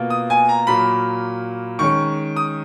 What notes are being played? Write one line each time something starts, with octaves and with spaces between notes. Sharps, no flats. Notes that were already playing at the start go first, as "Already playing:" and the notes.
Already playing: B2 A#3 F4
D#6
G#5
A#5
A#2 F#3 A#3 B5
D#3 G#3 C#4 C#6
D#6